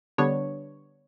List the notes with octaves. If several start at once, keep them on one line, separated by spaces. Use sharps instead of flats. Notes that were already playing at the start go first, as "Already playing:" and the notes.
D3 G3 B3 D4 C#5